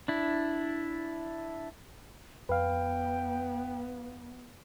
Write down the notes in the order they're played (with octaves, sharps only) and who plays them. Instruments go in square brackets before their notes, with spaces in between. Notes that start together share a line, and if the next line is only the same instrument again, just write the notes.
[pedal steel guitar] D4 E4
[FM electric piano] F2 [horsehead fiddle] B3 [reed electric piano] B4 F5 [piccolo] G5